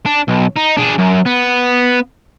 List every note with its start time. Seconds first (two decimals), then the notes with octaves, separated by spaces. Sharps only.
0.06 D4
0.28 B1
0.57 D#4
0.77 D4 G#4
0.98 F#2
1.25 B3